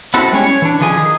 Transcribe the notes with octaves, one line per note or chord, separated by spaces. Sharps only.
B3 C4 E4 F#4 A4
G3 G#3 C#4 C#5
C#5
E3 D4
D3 D#3 F3 G#4 G#5
D#3 G#4